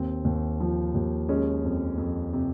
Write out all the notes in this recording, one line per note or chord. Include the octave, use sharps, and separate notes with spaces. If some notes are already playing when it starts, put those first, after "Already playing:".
Already playing: D#2 C4
D#2
F3
D#2
G#3 C#4
F2
F2
C3